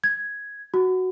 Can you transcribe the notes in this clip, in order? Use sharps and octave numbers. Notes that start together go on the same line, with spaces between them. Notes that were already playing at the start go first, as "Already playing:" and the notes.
G#6
F#4